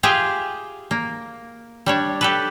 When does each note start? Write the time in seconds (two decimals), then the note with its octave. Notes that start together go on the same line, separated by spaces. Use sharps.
0.03 F4 G4 G#4 E5 F5
0.91 A#3
1.86 G3 D4 C#5
2.21 G4 A4 B4